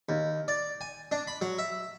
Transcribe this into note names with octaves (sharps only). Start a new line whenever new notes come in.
D#2
D5
G#5
D4
B5
F#3
E5